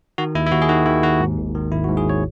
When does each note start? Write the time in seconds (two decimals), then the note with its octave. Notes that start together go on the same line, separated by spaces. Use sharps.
0.18 D#3 F#4
0.35 D#2 E4
0.47 E4
0.52 D#2 F#4
0.62 G#4
0.69 D#3 F#4
0.86 D#3 E4
1.03 D#2 F#4
1.20 G#2
1.38 G#1
1.55 D#3
1.72 G#1 E4
1.84 F#4
1.89 G#2
1.97 G#4
2.06 G#1 C#5